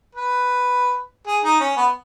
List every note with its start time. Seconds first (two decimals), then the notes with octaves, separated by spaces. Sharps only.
0.15 B4
1.27 G#4
1.44 D#4
1.61 C#4
1.77 B3